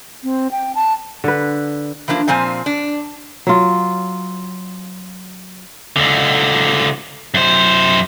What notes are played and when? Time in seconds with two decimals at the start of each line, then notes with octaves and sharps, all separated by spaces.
0.24 C4
0.51 G5
0.75 A5
1.24 D3 B4
2.08 E3 F3 A#3 D4
2.28 A#2 F3 C4 G#5
2.66 D4
3.47 F#3 F4
5.96 C#2 D3
7.34 F#2 C5